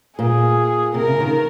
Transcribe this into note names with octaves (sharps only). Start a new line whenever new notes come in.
A#2 G#4
C3 A#4
C#3
D#3